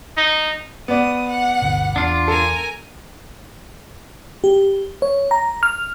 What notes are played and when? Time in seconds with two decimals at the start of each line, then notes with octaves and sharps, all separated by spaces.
0.17 D#4
0.88 B3 D5 D#6
1.28 F#5
1.62 G1 D2 B2
1.96 E2 D4 F4
2.28 A4 A#4 G#5
4.44 G4
5.02 C#5
5.31 A#5
5.63 F6